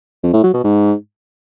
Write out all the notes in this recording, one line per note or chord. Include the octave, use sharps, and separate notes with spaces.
F2
A2
F#3
B2
G#2